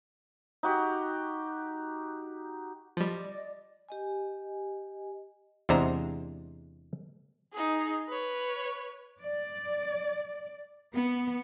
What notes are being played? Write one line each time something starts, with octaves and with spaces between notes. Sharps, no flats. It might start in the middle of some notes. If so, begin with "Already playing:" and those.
D#4 F#4 G4
F3 G3 D5 D#5
G4 D#5 G#5
E2 C3 G#3 D4 C5 A#5
D#4 G#4
B4 C#5
D5
B3